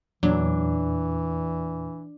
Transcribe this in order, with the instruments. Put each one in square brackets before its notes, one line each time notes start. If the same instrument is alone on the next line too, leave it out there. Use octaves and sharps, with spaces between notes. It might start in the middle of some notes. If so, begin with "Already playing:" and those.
[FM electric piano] E2 A#2 [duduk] E3 [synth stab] F#3 [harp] D4